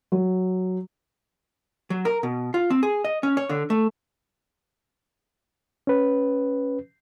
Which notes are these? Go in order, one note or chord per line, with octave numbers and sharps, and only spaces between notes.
F#3
F#3
A#4
B2
F4
C4
G#4
D#5
C#4
C#5
D3
A3
C#4 B4